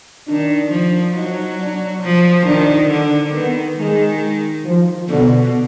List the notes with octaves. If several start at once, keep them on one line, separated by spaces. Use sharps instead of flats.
D#3 D4
F3
F#3 D#4
D4
F3
D#3 D4
D3
D#3 B3
D#3 G#3
F3
B2 D3